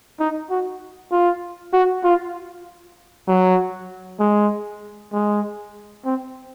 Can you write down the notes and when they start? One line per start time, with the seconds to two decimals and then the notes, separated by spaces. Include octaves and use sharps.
0.20 D#4
0.50 F#4
1.12 F4
1.73 F#4
2.04 F4
3.28 F#3
4.20 G#3
5.13 G#3
6.06 C4